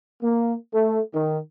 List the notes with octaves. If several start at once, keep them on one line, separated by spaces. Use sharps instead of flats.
A#3
A3
D#3